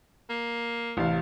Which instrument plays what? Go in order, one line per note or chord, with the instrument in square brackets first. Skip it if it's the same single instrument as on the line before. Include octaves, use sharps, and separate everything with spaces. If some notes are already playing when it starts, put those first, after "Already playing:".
[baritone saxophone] A#3
[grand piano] A1 C3 F5